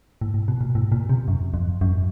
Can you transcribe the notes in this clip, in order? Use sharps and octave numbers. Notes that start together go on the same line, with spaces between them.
A2
A2
B2
A#2
A2
A#2
C3
F#2
F2
F#2